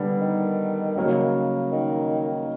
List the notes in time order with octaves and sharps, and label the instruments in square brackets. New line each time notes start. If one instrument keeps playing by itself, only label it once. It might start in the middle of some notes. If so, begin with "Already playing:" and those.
Already playing: [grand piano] D3 G3 B3 D4
[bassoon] D#3
[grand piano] C#3 F#3 A#3
[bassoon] D#3